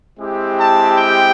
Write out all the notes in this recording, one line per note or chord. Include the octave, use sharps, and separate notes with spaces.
G#3 C4 E4 G4
A5
G5